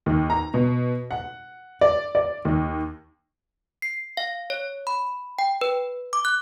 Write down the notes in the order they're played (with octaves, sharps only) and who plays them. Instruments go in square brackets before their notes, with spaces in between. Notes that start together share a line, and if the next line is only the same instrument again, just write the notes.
[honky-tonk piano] D#2
A#5
B2
F#5
D5
D5
D#2
[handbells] C7
F5
C#5
B5
G5
B4
D6
F#6